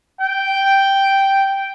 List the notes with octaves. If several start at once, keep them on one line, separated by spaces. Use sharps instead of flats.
G5